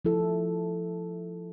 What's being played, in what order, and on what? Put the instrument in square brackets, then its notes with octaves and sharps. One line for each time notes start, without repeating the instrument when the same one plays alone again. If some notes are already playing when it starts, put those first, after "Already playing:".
[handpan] F3 E4 A4